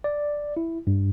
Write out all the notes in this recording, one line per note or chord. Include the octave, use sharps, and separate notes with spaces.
D5
E4
G2